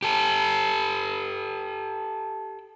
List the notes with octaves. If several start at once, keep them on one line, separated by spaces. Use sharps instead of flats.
G4 A4